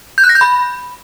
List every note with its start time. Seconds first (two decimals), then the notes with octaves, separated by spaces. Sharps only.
0.18 G6
0.24 F#6
0.29 A#6
0.35 G6
0.41 B5